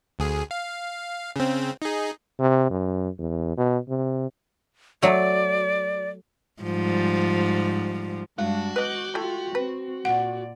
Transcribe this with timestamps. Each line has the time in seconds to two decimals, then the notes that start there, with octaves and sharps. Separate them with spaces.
0.19 D2 G#4
0.51 F5
1.36 C#3 C4
1.82 D#4 G#4
2.39 C3
2.70 F#2
3.19 E2
3.57 B2
3.89 C3
5.02 F#3 A3 D5
6.62 G#2 F3 G3
8.38 G2 G#3 D4 F#4
8.76 B4 D#5 D6 F#6 G6
9.15 A3 E4 F4 G4
9.55 C4 B4
10.05 A#2 D5 F#5